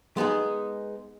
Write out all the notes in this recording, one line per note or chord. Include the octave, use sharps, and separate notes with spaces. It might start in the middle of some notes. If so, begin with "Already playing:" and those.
G#3 B3 D#4 G#4